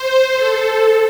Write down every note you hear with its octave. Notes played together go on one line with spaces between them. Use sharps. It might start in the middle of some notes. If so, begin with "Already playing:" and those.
Already playing: C5
A4